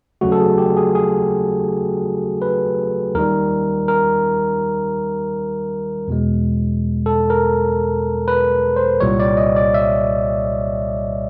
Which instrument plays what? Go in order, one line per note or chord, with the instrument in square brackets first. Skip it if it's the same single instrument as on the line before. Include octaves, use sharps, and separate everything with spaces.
[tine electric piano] D#2 C#3 F#3 A3 F#4
A4
G#4
G4
G#4
G#4
B4
D#2 D#3 G3 A#4
A#4
E2 B2 G#3
A4
A#4
B4
C5
C2 A#2 G3 C#5
D5
D#5
D5
E5